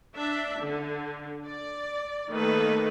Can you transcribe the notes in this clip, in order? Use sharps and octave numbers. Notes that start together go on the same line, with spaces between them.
D4 E5
D3
D5
D#3 A3 A#3 A4 B4